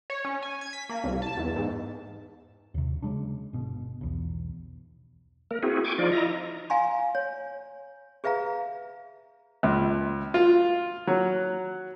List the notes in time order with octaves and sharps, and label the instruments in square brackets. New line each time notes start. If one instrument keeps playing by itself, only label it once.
[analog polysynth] C#5
C#4
G#5
G#6
B6
A#3
C2
A5
E2
G#2
[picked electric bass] D#2 C3
C#3 F#3 G#3 D4
G1 B2
B1 E2
[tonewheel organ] A#3 A#4
C4 E4 F#4 G#4
G5 G#5 C#6 D6
F3 D#4 F4 D5
E4 D#5 A#5
[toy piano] F5 G#5 A#5 C6
C#5
G#4 B4 E5 F5 A#5
[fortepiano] C#2
F4
F#3